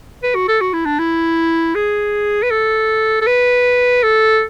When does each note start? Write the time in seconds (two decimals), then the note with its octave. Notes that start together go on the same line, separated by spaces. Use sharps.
0.23 B4
0.35 F#4
0.48 A4
0.61 F#4
0.74 E4
0.86 D4
0.99 E4
1.75 G#4
2.43 B4
2.51 A4
3.22 A4
3.27 B4
4.03 A4